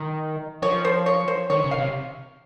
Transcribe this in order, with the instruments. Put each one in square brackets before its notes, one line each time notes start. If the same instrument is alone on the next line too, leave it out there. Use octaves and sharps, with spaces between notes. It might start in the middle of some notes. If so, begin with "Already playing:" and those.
Already playing: [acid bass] D#3
[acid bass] F3 [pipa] C#5
[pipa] C5
C#5
C5
[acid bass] D#3 [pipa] C#5
[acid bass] C#3
[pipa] F5
[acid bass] C3